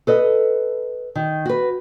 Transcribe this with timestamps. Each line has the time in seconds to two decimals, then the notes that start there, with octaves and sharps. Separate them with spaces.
0.07 A4 B4 D#5
1.15 D#3
1.46 F#4 B4